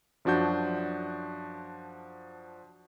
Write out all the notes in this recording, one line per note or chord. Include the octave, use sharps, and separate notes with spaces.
F#2 F3 D4 F#4 G6